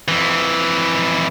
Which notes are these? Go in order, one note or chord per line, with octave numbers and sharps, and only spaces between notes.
F2 E3